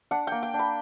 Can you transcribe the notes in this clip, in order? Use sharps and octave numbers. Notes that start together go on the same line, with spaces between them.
D4 F#5
A#3 G5
G5
D4
B5